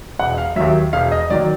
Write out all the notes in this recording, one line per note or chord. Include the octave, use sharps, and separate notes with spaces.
E1 F#5
F5
D#2 D#3 F#3 E5
E1 F5
D#5
D#3 F#3 D5